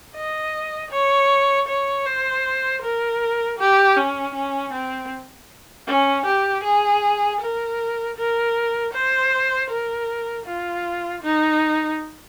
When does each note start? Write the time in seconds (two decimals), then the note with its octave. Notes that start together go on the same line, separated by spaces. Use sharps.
0.15 D#5
0.91 C#5
1.68 C#5
2.06 C5
2.82 A#4
3.59 G4
3.96 C#4
4.35 C#4
4.74 C4
5.87 C#4
6.26 G4
6.64 G#4
7.41 A#4
8.17 A#4
8.93 C5
9.70 A#4
10.46 F4
11.23 D#4